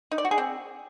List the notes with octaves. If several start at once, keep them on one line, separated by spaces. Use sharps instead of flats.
D#4
D5
F#4
G#4
C4